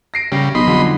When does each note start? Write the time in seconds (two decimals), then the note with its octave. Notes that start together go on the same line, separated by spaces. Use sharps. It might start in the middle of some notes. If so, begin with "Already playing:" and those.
0.14 A#6 C7 D7
0.32 C#3 G3
0.55 B1 D#5 B5 C6
0.67 F2 D3 G3